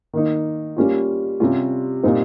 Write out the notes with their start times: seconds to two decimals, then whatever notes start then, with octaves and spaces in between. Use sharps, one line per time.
0.13 D#3 A#3 D#4
0.77 G3 A#3 C#4 F4
1.40 C3 G3 C#4 F4
2.03 A#2 G3 C4 D#4